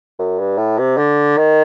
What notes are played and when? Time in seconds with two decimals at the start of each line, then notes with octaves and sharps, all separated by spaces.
0.19 F#2
0.39 G2
0.58 A2
0.79 C3
0.97 D3
1.37 D#3